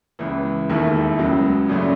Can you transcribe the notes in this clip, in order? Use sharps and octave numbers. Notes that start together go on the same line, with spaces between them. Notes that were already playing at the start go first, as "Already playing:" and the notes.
C#2 C#3 E3
E1 D#2 D#3 A3 E4
C#2 C#3 F#3
G#1 F#2 C#3 F#3 A3